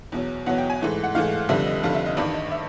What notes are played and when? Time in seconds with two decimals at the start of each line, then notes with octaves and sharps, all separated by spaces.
0.12 E2 B2 F#3
0.46 E2 B2 F#3 F#5
0.58 G5
0.70 G#5
0.81 G#2 E3 A3
1.04 F#5
1.15 G#2 E3 A3 F5
1.49 F1 F2 D3 G3 E5
1.66 D#5
1.83 F1 F2 D3 G3 F5
1.95 E5
2.06 D#5
2.17 A1 G2 D#3 D5
2.34 D#5
2.52 E5